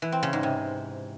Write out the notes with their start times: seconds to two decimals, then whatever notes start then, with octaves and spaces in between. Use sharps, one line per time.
0.02 E3
0.12 C4
0.23 C#3
0.33 G#2
0.43 C3